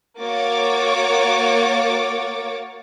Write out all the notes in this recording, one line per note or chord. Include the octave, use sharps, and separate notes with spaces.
A#3 F#4 C#5 D6 A6